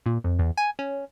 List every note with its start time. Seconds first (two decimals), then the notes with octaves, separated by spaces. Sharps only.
0.06 A#2
0.24 F2
0.39 E2
0.57 G#5
0.79 C#4